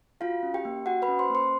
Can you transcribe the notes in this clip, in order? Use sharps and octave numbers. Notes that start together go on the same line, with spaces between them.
F4 F#4 F5
C#4
G4 G5
A#3
F#4 F#5
B4 B5
C#4
C5 C6
A#3 C5 C6